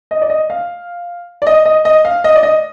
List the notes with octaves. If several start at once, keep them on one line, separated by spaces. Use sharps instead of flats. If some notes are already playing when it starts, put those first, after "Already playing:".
D#5
D5
D#5
F5
D5
D#5
D#5
D#5
F5
D#5
D5
D#5